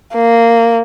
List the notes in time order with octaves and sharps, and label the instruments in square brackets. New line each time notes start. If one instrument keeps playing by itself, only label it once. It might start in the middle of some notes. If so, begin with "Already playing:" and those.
[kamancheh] A#3